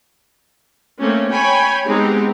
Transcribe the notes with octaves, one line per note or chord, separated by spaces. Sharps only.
A3 A#3 C4 C#4
C#5 G5 G#5 B5
G#3 B3 C4 D#4 G4